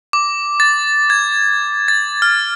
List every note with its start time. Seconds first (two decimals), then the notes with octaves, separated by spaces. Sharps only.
0.13 D6
0.60 A6
1.10 G#6
1.88 A6
2.22 F6